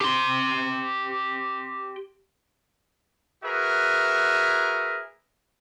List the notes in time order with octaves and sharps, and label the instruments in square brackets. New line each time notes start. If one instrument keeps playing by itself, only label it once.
[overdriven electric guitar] G4 C6
[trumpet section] F#4 G#4 A#4 B4 E5